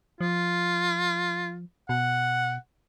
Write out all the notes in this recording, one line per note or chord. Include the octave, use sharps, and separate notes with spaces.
F3 F4
B2 F#5